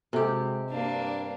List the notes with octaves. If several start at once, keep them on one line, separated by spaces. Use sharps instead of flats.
C3 G#3 F#4 G4 A4 G#5
G2 A#3 D4